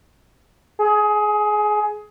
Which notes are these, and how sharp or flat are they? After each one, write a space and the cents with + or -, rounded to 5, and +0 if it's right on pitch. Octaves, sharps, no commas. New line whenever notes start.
G#4 +20